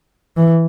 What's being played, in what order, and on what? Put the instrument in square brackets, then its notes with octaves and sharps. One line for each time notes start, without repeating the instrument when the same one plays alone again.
[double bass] E3